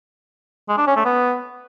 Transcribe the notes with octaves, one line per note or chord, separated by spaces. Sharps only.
G#3
D4
C#4
A3
B3